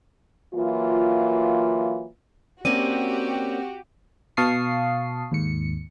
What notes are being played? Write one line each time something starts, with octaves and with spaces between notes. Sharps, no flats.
E3 F#3 A#3 F4
A#3 C4 C#4 F#4 G4 D5 D#7
B2 F5 A5 C#6 D#6 C7
D#2 G#2 C#7